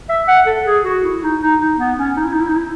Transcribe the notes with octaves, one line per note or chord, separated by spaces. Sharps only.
E5
F#5
A4
G#4
F#4
E4
D#4
D#4
D#4
B3
C#4
D#4
E4
D#4
E4
D#4
E4